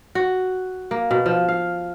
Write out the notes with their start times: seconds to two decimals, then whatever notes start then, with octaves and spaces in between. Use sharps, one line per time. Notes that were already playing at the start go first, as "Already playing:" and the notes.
0.15 F#4
0.91 A#3
1.11 B2
1.26 F3
1.49 F5